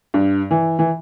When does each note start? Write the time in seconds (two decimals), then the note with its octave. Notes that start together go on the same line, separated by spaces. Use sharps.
0.14 G2
0.51 E3
0.79 E3